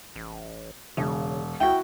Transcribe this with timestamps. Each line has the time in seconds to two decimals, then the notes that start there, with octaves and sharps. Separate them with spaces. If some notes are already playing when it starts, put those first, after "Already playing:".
0.16 A1
0.97 E1 C#3
1.60 C#2 E4 F#4 G5